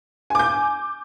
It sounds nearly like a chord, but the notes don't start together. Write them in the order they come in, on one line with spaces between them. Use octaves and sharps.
G#5 D6 G6